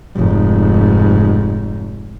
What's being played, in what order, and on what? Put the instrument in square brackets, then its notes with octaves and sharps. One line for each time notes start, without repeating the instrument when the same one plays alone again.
[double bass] F1 G#2